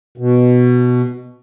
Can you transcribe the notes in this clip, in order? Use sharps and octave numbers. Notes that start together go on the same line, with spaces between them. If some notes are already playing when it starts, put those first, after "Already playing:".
B2